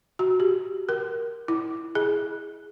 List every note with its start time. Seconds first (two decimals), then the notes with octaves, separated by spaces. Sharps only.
0.19 F#4
0.40 G4
0.89 A#4
1.48 E4
1.95 G#4